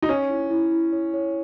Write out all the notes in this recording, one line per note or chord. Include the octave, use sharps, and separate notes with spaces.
D#4
C#4 C#5
E4
E4
E4
C#5
C#5